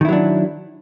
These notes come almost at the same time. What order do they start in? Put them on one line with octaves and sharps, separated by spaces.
D#3 E4 F#3 D4